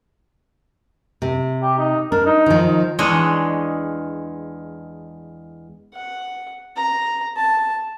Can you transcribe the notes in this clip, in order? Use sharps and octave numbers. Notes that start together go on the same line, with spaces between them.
C3
G4
D#4
D4 A#4
D#4
D#3 F3
E2 G#3 D4 C#5 D#5
F#5
A#5
A5